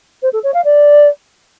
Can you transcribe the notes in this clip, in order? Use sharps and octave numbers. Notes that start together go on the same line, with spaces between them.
C5
A4
C#5
F5
D5